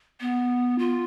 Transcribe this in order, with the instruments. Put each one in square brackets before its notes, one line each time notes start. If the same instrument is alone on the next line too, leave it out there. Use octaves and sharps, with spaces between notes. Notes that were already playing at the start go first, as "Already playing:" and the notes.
[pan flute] B3
F4